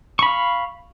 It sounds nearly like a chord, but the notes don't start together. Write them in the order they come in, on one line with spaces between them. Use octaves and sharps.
C#6 B5 F5